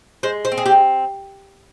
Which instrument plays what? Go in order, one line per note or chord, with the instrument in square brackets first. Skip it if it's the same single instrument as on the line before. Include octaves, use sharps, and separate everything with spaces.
[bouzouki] G#3 C5
C5
C4
G#4
G4